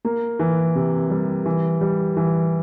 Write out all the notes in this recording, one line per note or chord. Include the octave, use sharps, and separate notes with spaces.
A#3
E3
C3
G3
E3
G3
E3